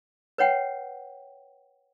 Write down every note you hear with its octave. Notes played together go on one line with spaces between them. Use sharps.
B4 C#5 F#5 G5